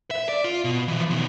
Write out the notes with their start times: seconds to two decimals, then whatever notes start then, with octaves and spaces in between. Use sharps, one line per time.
0.11 E5
0.29 D5
0.44 F4
0.64 B2
0.88 E3 F3
1.10 B2 D#3